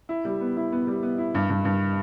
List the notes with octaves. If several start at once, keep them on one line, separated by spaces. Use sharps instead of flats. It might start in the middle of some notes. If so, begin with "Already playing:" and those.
E4
G3
B3
E4
B3
G3
B3
E4
G2
G2
G2